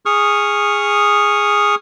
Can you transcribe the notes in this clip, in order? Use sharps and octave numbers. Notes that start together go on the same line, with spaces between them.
G#4 C#6 D#6 F6